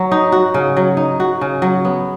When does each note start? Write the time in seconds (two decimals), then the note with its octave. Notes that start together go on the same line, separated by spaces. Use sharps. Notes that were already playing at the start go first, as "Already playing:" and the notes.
Already playing: F#3
0.12 D#4
0.32 F#4
0.54 C#3
0.77 F#3
0.97 D#4
1.20 F#4
1.41 C#3
1.62 F#3
1.85 B3